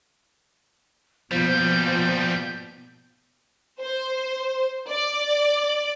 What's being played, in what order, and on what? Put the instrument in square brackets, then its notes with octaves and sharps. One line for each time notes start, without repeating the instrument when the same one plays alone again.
[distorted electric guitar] G#2 G3 [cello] B2 A#3 [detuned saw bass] F3 [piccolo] G6
[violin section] C5
D5